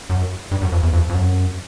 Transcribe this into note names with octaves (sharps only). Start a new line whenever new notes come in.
F#2
G2
F#2
F2
E2
F2
F2
F#2